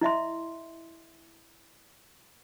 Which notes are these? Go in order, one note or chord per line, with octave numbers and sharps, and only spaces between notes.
E4 D#5 E5 C6